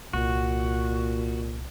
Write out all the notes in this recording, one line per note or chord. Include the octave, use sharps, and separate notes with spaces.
C2 A#2 F#4